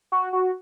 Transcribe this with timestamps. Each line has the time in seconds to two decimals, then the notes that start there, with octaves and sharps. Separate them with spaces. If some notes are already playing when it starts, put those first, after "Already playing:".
0.12 F#4
0.33 F#4